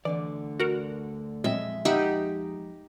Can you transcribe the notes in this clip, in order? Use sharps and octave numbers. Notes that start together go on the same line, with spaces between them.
D2 D3 E3 D5
F#4 A#4
F2 A#2 F#3 G#3 C4 D#5 E5
D#4 G4 E5 F#5 B5